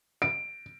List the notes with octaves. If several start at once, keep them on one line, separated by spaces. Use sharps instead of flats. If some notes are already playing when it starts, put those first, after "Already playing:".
D7